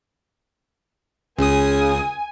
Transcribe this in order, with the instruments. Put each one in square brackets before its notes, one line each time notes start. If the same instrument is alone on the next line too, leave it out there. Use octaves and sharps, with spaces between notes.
[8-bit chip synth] C#2 D#6 [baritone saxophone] C#3 [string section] G#5